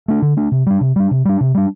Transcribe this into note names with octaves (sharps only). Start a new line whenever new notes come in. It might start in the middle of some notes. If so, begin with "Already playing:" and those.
A3 D4
D3
A3 D4
C3
G3 D4
C3
G3 D4
C3
G3 D4
C3
G3 D4